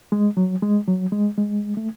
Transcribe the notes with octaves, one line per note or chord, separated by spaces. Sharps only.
G#3
F#3
G#3
F#3
G#3
G#3
A3